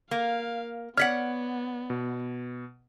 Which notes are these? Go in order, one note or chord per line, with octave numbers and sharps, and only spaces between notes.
A#3 F5
B3 C#5 D5 F#5 F6 B6 C#7
B2